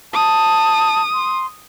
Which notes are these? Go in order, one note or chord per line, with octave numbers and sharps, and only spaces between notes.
A5 D#6
C6